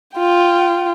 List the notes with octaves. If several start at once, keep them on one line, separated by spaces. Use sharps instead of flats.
F4 G5